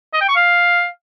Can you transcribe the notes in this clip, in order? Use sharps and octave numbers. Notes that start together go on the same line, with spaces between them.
D#5
G5
C#6
F5